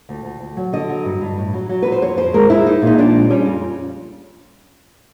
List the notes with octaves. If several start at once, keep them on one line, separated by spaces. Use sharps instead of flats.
D2
D2
D2
F#3
D3 D#5
F#3
G2
G2
A2
F#3
F#3
F#3 B4
C5
F2 C#5
F2 C5
G#3 A#4
G#3 E4
G#3 D#4
A#2
D#4
F3 D4
G#3
G3 C#4
F2